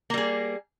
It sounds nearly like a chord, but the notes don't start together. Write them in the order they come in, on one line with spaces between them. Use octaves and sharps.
A#3 G3 G#4